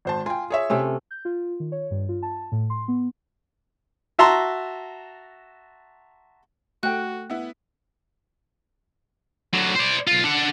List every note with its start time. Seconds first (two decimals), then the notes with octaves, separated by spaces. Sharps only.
0.05 G#1 C5 A5
0.26 F4 G5 G#5
0.50 G#4 C#5 E5
0.70 C3 A3 C#4
1.11 G6
1.25 F4
1.60 D#3
1.72 C#5
1.91 G2
2.09 F4
2.23 A5
2.52 A2
2.70 C6
2.88 B3
4.19 F#4 E5 A5 A#5 C6
6.83 A3 F#4 G5 F#6
7.30 B3 E4
9.54 D3 F#3
9.75 C5 D5
10.07 B1 F4
10.24 D4 F#5